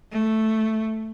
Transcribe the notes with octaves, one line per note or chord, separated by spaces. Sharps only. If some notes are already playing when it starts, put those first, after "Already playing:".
A3